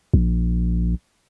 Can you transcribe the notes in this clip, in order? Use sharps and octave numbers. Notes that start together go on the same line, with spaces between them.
A#1